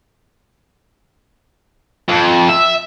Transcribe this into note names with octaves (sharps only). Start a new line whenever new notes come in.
F2
E5